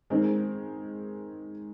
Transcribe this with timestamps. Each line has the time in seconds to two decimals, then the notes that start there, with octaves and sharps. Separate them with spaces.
0.10 D#3 G#3 C4